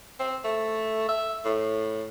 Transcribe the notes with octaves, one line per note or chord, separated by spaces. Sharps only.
C4
A3
E5
A2